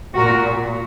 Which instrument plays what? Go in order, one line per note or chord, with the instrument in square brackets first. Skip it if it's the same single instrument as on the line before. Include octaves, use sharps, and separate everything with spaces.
[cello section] A#2 F#4 A#4